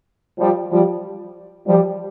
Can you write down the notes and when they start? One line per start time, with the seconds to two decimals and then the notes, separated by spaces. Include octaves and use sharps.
0.39 F3 G3
0.71 F3 G3
1.67 F3 G3